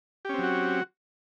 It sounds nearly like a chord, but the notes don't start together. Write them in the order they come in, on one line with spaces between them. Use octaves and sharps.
G4 C#4 C4 F#3 F#4